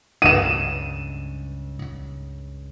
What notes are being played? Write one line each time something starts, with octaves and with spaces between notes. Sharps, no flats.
C#2 G2 D#7 E7